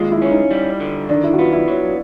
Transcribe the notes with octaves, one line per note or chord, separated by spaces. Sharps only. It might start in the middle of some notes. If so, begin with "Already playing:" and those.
Already playing: D#2 G#3 F4
E4
C#4
D#4
G3
D3
D#3 D4
E4
F#4
B3 F4
E4
F#3